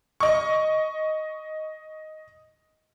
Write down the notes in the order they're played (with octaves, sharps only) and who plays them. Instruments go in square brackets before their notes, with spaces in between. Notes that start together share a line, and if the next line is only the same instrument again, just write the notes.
[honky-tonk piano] D#5 C#6